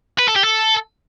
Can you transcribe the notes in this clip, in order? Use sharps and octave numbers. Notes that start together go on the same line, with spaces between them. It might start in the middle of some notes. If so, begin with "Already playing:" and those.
B4
A4
G4
A4